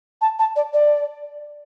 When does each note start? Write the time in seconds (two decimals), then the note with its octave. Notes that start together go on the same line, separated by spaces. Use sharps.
0.21 A5
0.39 A5
0.56 D5
0.73 D5